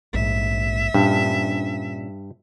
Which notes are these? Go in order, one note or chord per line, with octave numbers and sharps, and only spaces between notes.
A#1 G#2 E5
G2 A#2 C#4 D4